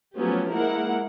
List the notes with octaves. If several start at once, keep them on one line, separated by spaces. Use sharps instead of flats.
F3 F#3 A3 B3 C#4 G4
G#3 A#3 E4 A#4 F#5